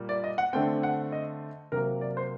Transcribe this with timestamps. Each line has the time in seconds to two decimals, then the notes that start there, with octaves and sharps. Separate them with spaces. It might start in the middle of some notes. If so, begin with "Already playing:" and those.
Already playing: A#2 G3 A#3
0.09 D5
0.24 D#5
0.38 F#5
0.53 D3 A3 C4 G5
0.83 F#5
1.12 D#5
1.72 C3 F#3 A#3 A#4
2.01 D5
2.17 C5